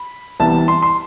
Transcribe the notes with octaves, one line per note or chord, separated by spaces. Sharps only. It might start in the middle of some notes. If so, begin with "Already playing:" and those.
Already playing: B5
C2 C3 E3 B3 A5
C6
C6